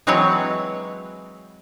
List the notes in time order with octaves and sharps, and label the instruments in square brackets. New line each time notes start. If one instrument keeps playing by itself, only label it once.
[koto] E3 F#3 G#3 C4 B4 C#5